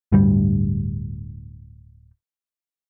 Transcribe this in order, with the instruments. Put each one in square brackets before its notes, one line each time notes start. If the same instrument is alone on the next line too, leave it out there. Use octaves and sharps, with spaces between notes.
[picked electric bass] D1 D2 G2 G3